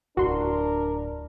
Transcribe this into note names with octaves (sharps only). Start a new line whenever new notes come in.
D1 G#1 D4 F#4 A#4 C6